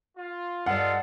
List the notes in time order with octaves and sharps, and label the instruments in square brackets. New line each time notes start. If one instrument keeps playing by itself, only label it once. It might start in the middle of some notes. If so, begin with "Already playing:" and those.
[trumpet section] F4
[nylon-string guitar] G2 D5 [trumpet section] G#3 A4 [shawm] F4 [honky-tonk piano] F#5